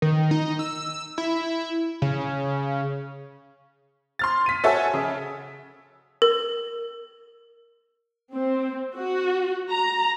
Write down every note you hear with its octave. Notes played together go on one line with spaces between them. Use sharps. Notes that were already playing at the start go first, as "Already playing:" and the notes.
D#3
D#4
E6
E4
C#3
C6 F6 A6
B6 D#7
F#4 A4 C#5 E5 G#5 E6
C#3
A#4
C4
F#4
A#5